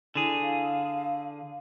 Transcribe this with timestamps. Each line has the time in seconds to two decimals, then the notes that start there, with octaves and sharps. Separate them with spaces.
0.15 D3 E4 G#4
0.43 F5